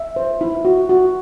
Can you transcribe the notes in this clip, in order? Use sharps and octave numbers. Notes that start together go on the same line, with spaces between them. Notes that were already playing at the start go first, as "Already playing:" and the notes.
Already playing: E5
C5
E4
F#4
F#4